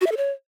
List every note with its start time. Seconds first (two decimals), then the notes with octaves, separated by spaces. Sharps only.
0.01 F#4
0.06 E5
0.12 A4
0.17 C#5